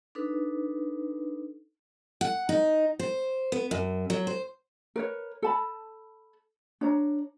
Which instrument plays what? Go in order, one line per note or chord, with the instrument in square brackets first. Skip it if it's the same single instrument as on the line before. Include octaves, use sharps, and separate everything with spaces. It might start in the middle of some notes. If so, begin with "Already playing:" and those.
[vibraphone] D4 D#4 A4 B4
[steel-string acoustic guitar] F#5
D#4
C5
B3
F#2
F#3
C5
[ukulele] A#4 B4 C#5
A4 A5 B5
D4 C#5 A#5